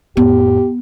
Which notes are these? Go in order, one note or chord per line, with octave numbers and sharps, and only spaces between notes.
F2 A2 B3 G4